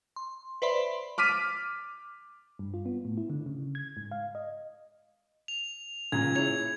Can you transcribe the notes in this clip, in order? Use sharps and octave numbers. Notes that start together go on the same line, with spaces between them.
C6
B4 C5 D5 E5 B5 C6
D6 F6 B6 D#7
G2
F4
B3
A2
E4
D3
C#3
G#6
G#2
F5
D#5
F7
C#2 A#2 C#3 G#6
E4 G#4 C#5 G#6 F7